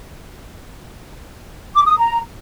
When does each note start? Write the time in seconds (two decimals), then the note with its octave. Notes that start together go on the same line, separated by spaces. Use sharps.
1.74 D6
1.86 D#6
1.97 A#5